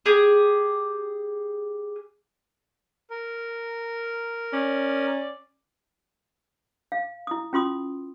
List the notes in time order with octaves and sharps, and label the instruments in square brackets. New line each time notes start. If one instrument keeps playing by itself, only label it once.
[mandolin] G4 G#4
[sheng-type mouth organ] A#4
[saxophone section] C#4 D5
[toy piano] F5
E4 D#6
C#4 F4 C6 D#6